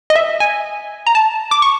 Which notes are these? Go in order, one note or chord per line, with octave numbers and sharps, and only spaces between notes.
D#5
E5
G#5
A#5
A5
D6
C#6